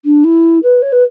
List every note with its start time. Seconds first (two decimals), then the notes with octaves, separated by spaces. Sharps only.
0.05 D4
0.24 E4
0.63 B4
0.82 C#5
0.92 B4